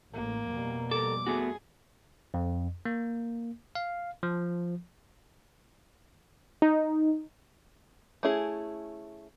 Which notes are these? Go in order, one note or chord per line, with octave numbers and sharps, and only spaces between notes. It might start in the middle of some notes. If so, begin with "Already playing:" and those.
A1 A2 A#3
F2 B2 G3
A4 A#4 D6
A3 B3 F#4 G#4
F2
A#3
F5
F3
D#4
A3 C#4 E4 G#4